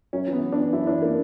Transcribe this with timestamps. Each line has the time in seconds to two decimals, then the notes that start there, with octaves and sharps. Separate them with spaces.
0.13 F#2 C#4
0.27 E3
0.33 B3
0.42 F#2
0.52 D4
0.58 E3
0.73 F#2 E4
0.87 E3 D4
1.02 A#3